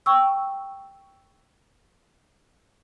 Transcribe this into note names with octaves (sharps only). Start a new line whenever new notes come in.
G5 C#6 E6